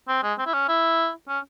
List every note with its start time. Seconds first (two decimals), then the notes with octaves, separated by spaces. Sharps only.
0.08 C4
0.23 G#3
0.38 C4
0.46 E4
0.53 C#4
0.68 E4
1.28 C#4